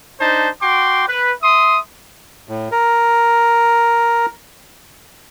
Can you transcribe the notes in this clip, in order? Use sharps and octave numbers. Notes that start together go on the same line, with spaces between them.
D4 D#4 C5 A5
F#4 G5 C6 D6
B4
E5 C6 D#6
A2
A#4